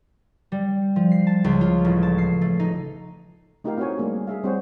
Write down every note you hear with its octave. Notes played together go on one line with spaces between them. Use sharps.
G3
F3
C7
A5
C#2
F4
A1
A5
C7
A3
D#4
A3 D#4 F4 G4 A#4 F5
C4 E4 F#4 C5 C#5 G#5
G3 A3 A#3 D4 G#4
G#4 E5 F5
G3 C4 E4 C5 C#5 F#5